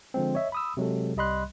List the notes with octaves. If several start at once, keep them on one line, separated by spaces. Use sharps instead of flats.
D3 F3 G#3 C4
C#5 D#5 E5
B5 D#6 E6
C3 F#3 G#3 A4
C2 G3 D#5 B5 C6 F#6